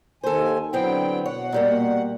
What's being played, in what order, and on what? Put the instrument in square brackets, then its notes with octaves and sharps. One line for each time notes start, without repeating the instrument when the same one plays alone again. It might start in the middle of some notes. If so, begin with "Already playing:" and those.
[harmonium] D#2 D#3 G#5 [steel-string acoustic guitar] A4 C5
[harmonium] D3 F#3 G5 [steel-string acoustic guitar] B3 C4 E4
[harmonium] B2 F#5 [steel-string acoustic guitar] C#5
[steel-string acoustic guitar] A#2 G3 A#3